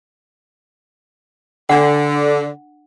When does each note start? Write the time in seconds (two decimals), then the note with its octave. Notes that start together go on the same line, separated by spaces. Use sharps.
1.69 D3 D4 F#5